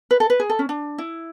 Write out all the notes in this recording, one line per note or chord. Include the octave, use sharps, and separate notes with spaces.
B4
A4
B4
G#4
A4
C#4
D4
E4